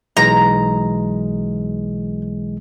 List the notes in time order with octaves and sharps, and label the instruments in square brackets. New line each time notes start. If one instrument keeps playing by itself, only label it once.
[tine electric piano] B1 E3 G#3 [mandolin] A#5